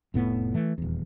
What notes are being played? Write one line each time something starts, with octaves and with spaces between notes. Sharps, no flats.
F1 A2 B3
E3 A3
D#1 E2